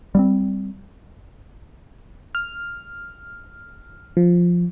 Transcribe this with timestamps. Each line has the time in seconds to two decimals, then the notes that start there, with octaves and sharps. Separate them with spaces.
0.15 G3 B3 C4
2.35 F6
4.17 F3